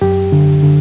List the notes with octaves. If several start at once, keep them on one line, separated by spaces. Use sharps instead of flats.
F#2 G4
D3
D3